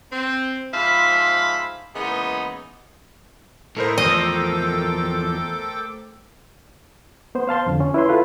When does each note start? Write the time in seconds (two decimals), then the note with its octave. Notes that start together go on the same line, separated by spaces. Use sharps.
0.12 C4
0.73 G#2 F3 C5 E5 F5 B5
1.94 C#3 E3 G#3 A#3 B3 D#4
3.76 A2 A3 D#4 E4 A#4 C5
3.98 E2 F3 A4 D#5 G5 D6
7.35 B3 C5
7.47 C5 F5 A5 C6
7.66 F2 D3
7.80 C#4
7.94 E4 B4 C#5 C6
8.09 E4 F4 A4 B4 F5